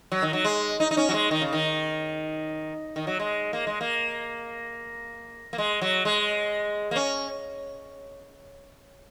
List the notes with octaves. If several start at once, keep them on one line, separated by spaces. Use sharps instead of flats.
F#3
D#3
F#3
G#3
D#4
D#4
C#4
F#3
G#3
D#3
C#3
D#3
D#3
F#3
G#3
A#3
G#3
A#3
A#3
G#3
F#3
G#3
A#3
C#4